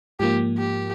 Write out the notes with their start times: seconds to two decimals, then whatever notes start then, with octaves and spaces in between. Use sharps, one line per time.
0.20 G#2 F3 A#3 G4
0.58 G4